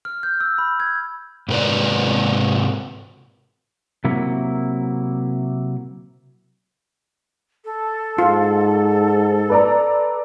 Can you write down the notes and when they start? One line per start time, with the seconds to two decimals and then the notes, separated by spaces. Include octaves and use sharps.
0.05 F6
0.23 G6
0.40 E6
0.58 B5
0.80 G#6
1.49 G#2 C3 A#4 B4 D5
4.04 C3 F#3 A#3 E4
7.65 A4
8.18 G#2 F4
9.50 B4 D5 A#5